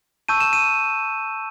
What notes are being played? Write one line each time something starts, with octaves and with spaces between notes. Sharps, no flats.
A5 C#6 E6 G6 D#7
E7
D#7